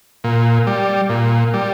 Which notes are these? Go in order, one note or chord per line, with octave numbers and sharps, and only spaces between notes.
A#2
G3
A#2
G3